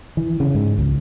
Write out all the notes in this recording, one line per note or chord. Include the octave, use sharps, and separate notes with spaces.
E3
C#3
G#2
C#2